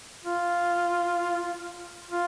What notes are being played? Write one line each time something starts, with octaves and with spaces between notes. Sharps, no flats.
F4
F4